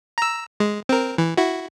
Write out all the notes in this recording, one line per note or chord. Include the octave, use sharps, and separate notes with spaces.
A#5 E6
G#3
C4 A#4
E3
E4 F#4